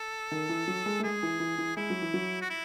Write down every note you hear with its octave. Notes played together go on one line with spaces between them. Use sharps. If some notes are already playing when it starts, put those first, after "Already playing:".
Already playing: A4
D#3
E3
F#3
G#3
A3
G#3 G#4
E3
E3
E3
G#3 E4
F#3
E3
F#3
F#4
E4